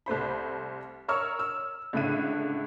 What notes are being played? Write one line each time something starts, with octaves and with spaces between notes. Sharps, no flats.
C2 A3 C5 B5
A#4 C#5 C#6 E6 F6
E6
C#2 A2 D3 E5 D#7